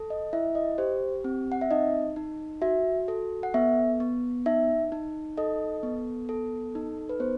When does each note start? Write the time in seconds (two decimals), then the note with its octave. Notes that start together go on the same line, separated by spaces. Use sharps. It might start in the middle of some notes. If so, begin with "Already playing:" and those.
Already playing: A4
0.10 D#5
0.33 E4 E5
0.55 D#5
0.78 G4 C5
1.24 C4
1.52 F#5
1.61 E5
1.71 D#4 D#5
2.16 D#4
2.62 F#4 E5
3.08 A4
3.43 F#5
3.54 B3 E5
4.00 B3
4.46 D#4 E5
4.92 D#4
5.37 A4 D#5
5.83 B3
6.29 A4
6.75 D#4
7.09 B4
7.20 B3 C5